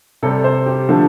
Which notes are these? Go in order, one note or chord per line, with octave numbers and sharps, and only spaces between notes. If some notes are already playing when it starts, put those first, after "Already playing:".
C3 G3 A4
C5
G4
D3 F3 A3